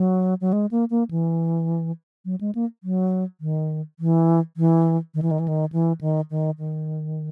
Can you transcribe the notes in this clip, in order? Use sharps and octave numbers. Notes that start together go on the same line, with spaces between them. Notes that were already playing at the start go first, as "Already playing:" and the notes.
Already playing: F#3
F#3
G#3
A#3
A#3
E3
F#3
G#3
A#3
F#3
D#3
E3
E3
D#3
E3
D#3
E3
D#3
E3
D#3
D#3
D#3